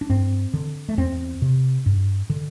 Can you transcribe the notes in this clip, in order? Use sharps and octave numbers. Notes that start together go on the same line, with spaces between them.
D4
G2 C4
D3
A3
E2 C4
C3
G2
D3